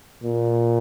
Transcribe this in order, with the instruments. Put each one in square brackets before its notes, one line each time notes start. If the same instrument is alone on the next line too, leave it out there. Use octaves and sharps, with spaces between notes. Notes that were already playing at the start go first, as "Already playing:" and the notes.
[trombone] A#2